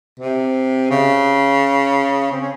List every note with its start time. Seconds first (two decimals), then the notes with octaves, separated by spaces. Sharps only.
0.19 C3
0.90 C#3
2.32 C4
2.41 C#4